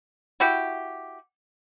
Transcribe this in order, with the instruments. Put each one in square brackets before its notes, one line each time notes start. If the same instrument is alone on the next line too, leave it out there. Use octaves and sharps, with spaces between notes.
[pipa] E4 F#4 G4